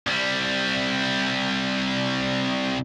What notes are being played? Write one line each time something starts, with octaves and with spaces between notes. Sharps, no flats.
C2 G3